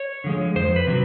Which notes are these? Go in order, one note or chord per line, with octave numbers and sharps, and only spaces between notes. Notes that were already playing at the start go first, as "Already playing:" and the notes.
Already playing: C#5
D3 F3 G#3
F2 C5
B4
C3 D#3 F#3